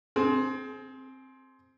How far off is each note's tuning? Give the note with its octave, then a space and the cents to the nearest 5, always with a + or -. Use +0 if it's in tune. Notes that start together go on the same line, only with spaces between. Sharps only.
C4 +5 G#4 +35